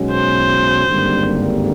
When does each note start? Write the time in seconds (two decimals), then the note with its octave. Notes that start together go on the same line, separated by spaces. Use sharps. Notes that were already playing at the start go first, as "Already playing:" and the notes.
Already playing: B1 B2 G#3 C#4 F#4
0.12 C5
0.86 G#1 G2 D3 G3 A#3